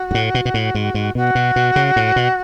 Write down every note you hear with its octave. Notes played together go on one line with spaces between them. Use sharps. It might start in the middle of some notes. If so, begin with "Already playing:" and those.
Already playing: F#4
G#2
A2
B2
B2
A2
G#2
G#2
B2 F#4
B2
B2
C#3
A2
B2